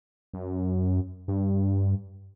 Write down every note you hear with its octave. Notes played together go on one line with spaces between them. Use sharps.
F#2
G2